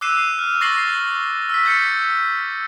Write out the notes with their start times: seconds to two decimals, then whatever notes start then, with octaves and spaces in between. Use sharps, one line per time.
0.01 D6 E6 F#6 C7 D#7 E7
0.39 F6
0.61 C#6 A6 A#6 C7 F#7 G7
1.50 E6 B6
1.65 G6 A6 B6 C#7